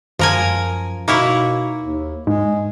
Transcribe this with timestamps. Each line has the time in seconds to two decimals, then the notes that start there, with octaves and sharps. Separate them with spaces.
0.19 F#2 F3 A#4 G#5
1.08 B2 A#3 D#4 E4 C#5
1.81 D#2
2.27 G#2 G#3